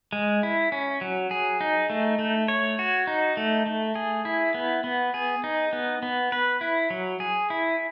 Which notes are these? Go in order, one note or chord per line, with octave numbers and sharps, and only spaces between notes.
G#3
E4
C#4
F#3
G#4
D#4
A3
A3
C#5
F#4
D#4
A3
A3
G#4
E4
B3
B3
G#4
D#4
B3
B3
B4
E4
F#3
G#4
E4